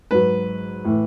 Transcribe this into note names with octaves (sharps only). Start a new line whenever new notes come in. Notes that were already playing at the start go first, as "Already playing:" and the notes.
G#2 F#3 B4
A2 E3